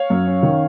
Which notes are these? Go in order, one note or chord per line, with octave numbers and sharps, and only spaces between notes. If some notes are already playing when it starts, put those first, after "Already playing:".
Already playing: C#5 F5
F#2
C#4
D#3